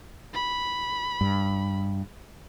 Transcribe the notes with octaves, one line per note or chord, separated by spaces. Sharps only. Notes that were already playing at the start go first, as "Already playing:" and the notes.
B5
G2